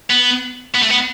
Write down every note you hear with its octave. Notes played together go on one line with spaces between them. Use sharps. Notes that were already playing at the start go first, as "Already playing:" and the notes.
B3
B3
A3
B3